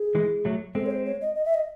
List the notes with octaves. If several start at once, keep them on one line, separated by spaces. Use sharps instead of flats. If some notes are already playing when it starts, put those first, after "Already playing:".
Already playing: G#4
E3 G#3
F#3 A3
G#3 C4 A4
C#5
C5
C#5
D#5
D#5
E5
D#5